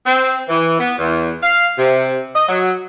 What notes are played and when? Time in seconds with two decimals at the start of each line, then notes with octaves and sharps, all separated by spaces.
0.06 C4
0.49 E3
0.79 B3
0.98 E2
1.43 F5
1.78 C3
2.36 D#5
2.49 F#3